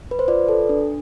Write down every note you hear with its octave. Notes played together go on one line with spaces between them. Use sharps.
B4
C5
F4 B4 D5
A4
D4